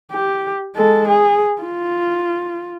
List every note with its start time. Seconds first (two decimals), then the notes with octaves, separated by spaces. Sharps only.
0.12 G4
0.75 G#3 A4
1.08 G#4
1.62 F4